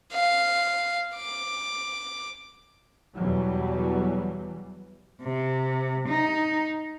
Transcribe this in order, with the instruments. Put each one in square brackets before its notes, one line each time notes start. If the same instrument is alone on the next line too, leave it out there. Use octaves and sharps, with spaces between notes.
[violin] F5
D6
[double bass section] E2 B2 E3 F#3 G3
[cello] C3
D#4